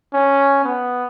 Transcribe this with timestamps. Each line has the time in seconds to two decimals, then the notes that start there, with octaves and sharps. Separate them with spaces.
0.13 C#4
0.64 B3